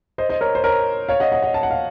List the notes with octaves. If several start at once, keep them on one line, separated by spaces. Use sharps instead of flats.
C5 D#5
C5 D#5
A#4 C#5
C5
A#4 C#5
C#5 F5
D#5 F#5
D#5 F#5
D#5 F#5
A5
F#5
F5